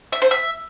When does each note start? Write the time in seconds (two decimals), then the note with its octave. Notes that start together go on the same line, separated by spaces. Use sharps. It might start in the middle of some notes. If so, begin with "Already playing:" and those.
0.12 E5
0.22 C5
0.31 E5